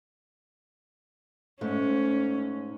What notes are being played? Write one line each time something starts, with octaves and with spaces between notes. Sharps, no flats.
G#2 A3 C#4